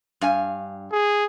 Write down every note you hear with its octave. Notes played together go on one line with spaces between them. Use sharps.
G2 F5 G#5
G#4